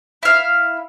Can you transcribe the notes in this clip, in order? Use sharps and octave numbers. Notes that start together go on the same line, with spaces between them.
E4 F5